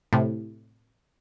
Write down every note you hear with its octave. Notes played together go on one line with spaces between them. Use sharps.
A2 C3